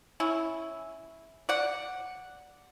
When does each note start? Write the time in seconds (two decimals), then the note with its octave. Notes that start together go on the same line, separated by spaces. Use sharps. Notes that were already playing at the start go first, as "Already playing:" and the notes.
0.20 C#4 E4
1.49 D5 F#5